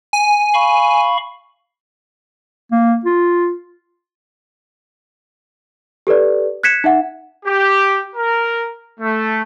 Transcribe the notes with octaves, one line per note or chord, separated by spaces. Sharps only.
G#5
F5 B5 C#6
A#3
F4
G4 A4 B4 D5
F#6 G#6 B6 C#7 E7
D#4 E5 F#5
G4
A#4
A3